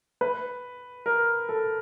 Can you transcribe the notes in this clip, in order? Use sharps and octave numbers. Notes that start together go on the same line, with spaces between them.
B4
A#4
A4